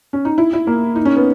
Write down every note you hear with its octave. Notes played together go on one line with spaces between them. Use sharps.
C#4
D#4
E4
E4
A#3
D#4
C#4
B3